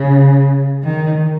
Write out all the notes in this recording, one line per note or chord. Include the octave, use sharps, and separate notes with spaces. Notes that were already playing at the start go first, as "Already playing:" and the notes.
Already playing: C#3
D#3